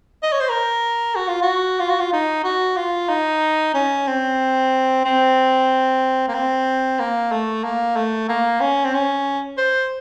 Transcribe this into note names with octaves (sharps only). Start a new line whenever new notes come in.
D#5
C#5
C5
A#4
F#4
F4
F#4
F4
F#4
F4
D#4
F#4
F4
D#4
C#4
C4
C4
A#3
C4
A#3
A3
A#3
A3
A#3
C#4
C4
C#4
C5